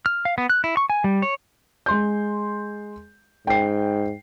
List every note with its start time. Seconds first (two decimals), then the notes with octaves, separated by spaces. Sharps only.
0.06 F6
0.25 F5
0.38 B3
0.50 F#6
0.64 E4
0.77 C#6
0.90 G#5
1.04 G3
1.22 C#5
1.86 G#3 C6 G6
3.47 G#2 G5 C7